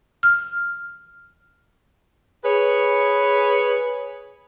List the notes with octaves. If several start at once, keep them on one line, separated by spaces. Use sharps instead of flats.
F6
G#4 B4 C#5